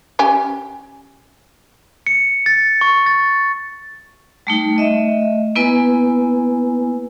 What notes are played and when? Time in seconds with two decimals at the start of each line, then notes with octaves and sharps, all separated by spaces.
0.19 C#4 G4 G#5
2.07 C#7
2.46 A6
2.81 C#6
3.06 A6
4.47 G3 A3 D#4
4.77 A3 D#5 E5
5.56 A#3 B3 E4 B4 G#5